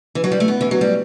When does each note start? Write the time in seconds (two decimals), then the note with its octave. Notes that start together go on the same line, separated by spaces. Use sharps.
0.15 E3
0.24 F#3
0.32 G3
0.40 A3
0.48 B3
0.61 E3
0.71 F#3
0.81 G3